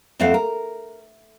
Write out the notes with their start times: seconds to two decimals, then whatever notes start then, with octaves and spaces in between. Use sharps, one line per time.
0.20 F2 A3 C4 A4 F5 F#5
0.34 A#4